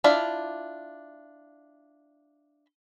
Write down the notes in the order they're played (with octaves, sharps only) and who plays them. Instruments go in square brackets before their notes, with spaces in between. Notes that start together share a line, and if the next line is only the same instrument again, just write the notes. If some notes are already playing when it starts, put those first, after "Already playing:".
[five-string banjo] D4 E4 F4 D5